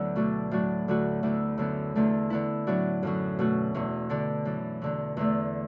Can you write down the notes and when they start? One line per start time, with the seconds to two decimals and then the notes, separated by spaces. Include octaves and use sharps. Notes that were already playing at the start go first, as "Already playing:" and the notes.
Already playing: D2 D3 F#3 B3 E4
0.16 B2 A3 D4 F#4
0.51 A2 F#3 D4 F#4
0.88 D2 D3 A3 F#4
1.23 D2 D3 B3 E4
1.58 F#2 D3 B3
1.96 E2 D3 A3
2.30 D3 B3 E4
2.67 A2 F#3 B3 D4 F#4
3.03 F#2 D3 F#3
3.39 B2 A3 F#4
3.74 E2 B2 B3
4.09 D3 B3 D4
4.45 F#2 E3 D4
4.82 E2 D3 B3
5.17 E2 D3 A3